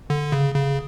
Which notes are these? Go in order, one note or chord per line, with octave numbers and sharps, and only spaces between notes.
D3
C#3
C#3